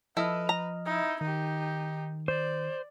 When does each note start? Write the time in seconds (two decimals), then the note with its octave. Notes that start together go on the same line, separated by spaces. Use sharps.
0.17 F3 E4 A4 B4 D#5 F6
0.49 A#5
0.86 D#4 E4
1.21 D#3 D#4 G4
2.28 C5 D5